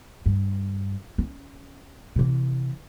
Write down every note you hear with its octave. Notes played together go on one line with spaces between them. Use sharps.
G2
C#4
C3 E3